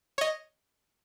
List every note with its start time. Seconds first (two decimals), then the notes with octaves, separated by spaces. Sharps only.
0.18 C#5 D#5